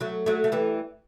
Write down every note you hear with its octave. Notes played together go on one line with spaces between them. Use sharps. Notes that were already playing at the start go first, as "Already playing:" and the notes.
F#3 A3
F#3 A3
A3
E3 G3